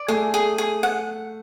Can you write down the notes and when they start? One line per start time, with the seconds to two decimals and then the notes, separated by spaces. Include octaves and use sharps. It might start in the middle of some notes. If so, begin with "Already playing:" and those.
Already playing: D5
0.08 A3 G#4
0.34 G#4
0.58 G#4
0.83 F#5